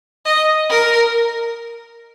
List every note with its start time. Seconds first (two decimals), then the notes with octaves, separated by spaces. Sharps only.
0.25 D#5
0.69 A#4